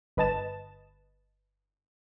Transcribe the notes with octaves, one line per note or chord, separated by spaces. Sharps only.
G1 B4 D#5 A5 A6 E7